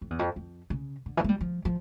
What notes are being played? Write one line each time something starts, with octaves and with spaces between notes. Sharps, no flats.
F2
E2
F2
F2
C#3
D3
E3
A3
G3
F3
F3